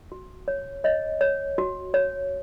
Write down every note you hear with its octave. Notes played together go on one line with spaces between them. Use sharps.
F#4
C#5
C#5 D#5
C#5
F#4
C#5